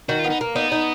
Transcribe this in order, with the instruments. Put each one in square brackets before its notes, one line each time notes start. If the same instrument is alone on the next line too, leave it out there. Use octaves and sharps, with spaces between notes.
[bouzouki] D#3 [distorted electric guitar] F#4
[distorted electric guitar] F4
[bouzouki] B3
[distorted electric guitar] D#4
[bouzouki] A#3
[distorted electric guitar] B3 [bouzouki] D#4
[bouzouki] D#4